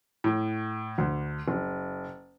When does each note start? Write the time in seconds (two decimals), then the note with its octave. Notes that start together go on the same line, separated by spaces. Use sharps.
0.24 A2
0.98 D2
1.48 F#1